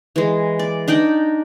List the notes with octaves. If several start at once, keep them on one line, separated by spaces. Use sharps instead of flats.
E3 G#3
D5
D4 D#4 D5 G5